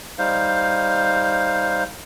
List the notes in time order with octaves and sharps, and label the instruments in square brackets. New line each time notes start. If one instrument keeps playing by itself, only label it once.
[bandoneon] G3 D#4 C5 F5